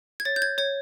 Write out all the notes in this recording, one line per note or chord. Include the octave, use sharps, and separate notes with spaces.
G#6
C#5 A6
G6
G#6
C#5 G#6